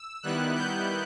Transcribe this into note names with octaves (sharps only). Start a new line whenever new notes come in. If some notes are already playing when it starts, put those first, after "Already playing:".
Already playing: E6
D#3 G3 B3 E4 F#6
G6